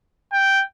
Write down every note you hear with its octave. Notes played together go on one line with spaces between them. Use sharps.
G5